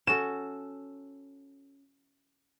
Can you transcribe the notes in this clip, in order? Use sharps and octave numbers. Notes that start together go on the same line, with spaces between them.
C#4 F#4 A4 E7